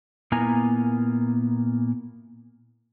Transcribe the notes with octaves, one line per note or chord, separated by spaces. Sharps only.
A#2 A#3 B3 E4 G#5 A#5